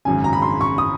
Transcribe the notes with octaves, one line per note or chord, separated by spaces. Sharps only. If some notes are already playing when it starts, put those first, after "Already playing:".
G#1 F#2 C#3 G#5
A#5
B5
C6
C#6
D#6